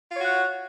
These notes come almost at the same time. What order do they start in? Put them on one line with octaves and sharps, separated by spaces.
F4 C#5 F#4 F#5